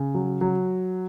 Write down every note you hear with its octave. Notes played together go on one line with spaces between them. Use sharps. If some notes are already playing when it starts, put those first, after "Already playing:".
Already playing: C#3
F#3
F#3